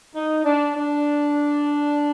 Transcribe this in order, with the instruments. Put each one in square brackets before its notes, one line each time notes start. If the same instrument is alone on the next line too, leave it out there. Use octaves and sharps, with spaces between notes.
[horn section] D#4
D4
D4